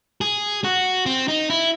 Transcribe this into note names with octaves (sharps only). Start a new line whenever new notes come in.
G#4
F#4
C4
D#4
E4